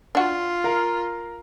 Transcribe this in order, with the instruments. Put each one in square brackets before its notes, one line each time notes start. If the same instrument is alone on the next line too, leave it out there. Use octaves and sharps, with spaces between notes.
[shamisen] D4 F#4 [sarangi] F4
[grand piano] A#4 F5 A#5